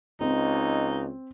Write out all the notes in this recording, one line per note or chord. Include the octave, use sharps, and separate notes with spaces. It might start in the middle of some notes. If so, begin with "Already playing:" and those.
C#2 C4 D#4